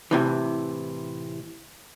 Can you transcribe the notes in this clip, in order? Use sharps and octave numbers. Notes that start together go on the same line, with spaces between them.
A2 C3 E3